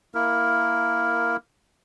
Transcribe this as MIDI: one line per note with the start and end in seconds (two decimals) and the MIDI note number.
0.14 1.37 58
0.14 1.37 64
0.14 1.37 70